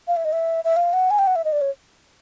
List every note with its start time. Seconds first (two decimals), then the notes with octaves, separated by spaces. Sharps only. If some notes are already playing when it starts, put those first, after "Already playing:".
0.08 F5
0.16 E5
0.25 D#5
0.33 E5
0.65 E5
0.76 F5
0.93 F#5
1.11 G#5
1.19 G5
1.27 F#5
1.36 E5
1.45 D#5
1.52 D5
1.61 C#5